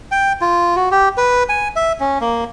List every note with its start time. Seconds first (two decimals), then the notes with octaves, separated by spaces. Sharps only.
0.11 G5
0.41 F4
0.76 F#4
0.91 G4
1.17 B4
1.49 G#5
1.76 E5
2.00 C#4
2.21 A#3